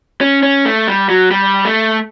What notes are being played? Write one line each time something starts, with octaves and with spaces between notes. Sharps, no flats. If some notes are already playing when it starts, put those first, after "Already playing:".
C#4
C#4
A3
G3
F#3
G3
A3